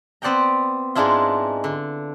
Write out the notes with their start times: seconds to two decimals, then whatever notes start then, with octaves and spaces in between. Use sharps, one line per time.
0.22 B3 C4 D5 F#5 G5 A#5
0.95 G#2 G#3 D4 E4 F4
1.64 D3